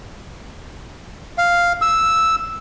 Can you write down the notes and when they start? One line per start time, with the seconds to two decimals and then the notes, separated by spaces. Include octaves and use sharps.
1.38 F5
1.82 E6